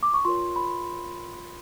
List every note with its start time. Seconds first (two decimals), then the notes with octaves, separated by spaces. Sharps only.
0.03 D6
0.14 C#6
0.25 F4 A#4 C#5 C6
0.56 B5